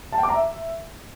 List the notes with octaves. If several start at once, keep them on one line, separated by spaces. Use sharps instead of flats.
A5
G5
D6
A#5
E5